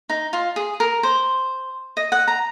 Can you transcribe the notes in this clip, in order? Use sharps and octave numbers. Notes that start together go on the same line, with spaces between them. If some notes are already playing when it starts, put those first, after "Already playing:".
D#4
F4
G#4
A#4
C5
D#5
F#5
A#5